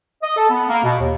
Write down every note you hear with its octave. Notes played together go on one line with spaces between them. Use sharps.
D#5
A4
B3
A#3
B2
D#2